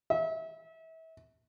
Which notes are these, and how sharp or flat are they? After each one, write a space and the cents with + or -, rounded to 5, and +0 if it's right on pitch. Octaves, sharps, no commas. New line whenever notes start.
E5 -30